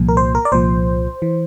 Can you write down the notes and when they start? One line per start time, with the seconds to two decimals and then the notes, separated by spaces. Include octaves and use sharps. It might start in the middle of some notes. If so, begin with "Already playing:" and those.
Already playing: C2 A#2 F3
0.09 A#4
0.17 C5
0.35 A#4
0.45 D5
0.52 C2 A#2 F3 C5
1.22 E3